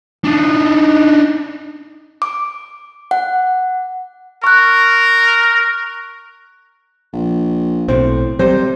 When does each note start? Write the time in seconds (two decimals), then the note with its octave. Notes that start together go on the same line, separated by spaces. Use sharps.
0.24 D4 D#4
2.22 D6
3.11 F#5
4.44 A#4 C#6 F#6
7.13 A#1
7.88 B1 A2 C4
8.39 C3 F#3 G3 C5